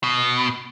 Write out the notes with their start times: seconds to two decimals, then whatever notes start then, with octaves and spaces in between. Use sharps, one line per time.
0.03 B2